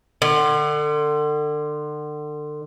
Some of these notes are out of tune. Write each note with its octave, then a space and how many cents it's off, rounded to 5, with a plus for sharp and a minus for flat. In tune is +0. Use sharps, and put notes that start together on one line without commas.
D3 +35